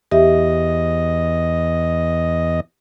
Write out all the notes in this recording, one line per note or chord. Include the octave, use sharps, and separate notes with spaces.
E2 G4 D#5 E5